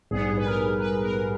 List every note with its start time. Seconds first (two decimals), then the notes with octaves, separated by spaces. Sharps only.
0.11 A#1 G#2 G3 B3 G#4
0.37 B4
0.46 A#4
0.79 B4
1.02 A#4